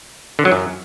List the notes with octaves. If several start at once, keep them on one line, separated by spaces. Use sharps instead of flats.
D3
F#3
F#2